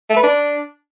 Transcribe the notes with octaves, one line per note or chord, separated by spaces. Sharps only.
A3
B4
D4